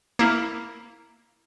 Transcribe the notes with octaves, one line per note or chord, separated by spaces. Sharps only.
A#3 E4